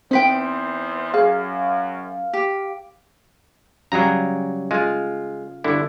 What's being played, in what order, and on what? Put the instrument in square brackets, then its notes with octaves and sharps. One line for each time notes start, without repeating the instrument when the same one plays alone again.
[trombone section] E2 C5 [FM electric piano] C4 [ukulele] D#4 B4 G5
[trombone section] F#2 [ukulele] G#4 [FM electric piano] F5
[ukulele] G4
[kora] C#3 G3 G#4 [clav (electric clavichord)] F#3 A#5
[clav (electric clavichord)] G#3 [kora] F4
[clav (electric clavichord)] G1 D3 E4